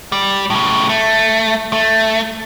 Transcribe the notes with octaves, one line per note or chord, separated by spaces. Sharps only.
G3
A2 C#3
A3
A3